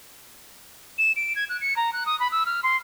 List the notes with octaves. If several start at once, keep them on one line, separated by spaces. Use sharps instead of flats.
E7
D7
G#6
F#6
C#7
A#5
F#6
D#6
B5
E6
F6
C6